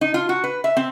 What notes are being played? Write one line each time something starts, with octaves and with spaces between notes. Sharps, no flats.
D#4
F4
F#4
B4
E5
C4